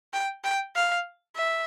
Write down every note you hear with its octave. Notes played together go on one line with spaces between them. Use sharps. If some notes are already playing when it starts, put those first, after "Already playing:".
G5
G5
F5
E5